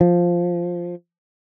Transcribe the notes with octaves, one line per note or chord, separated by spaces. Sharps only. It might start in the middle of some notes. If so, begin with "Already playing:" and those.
F3